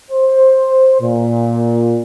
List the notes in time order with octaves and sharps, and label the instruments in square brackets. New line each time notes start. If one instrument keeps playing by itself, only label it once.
[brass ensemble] C5
A#2